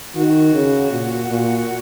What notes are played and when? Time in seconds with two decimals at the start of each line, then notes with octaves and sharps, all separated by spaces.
0.16 D#3 F#4
0.54 C#3
0.91 A#2
1.29 A#2